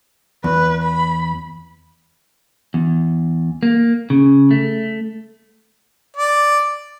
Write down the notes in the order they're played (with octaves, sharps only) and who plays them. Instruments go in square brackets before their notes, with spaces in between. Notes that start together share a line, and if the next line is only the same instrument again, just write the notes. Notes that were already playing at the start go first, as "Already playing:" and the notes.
[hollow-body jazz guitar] E2 [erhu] B4
[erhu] B5
[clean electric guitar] E2
A#3
C#3
A3
[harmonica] D5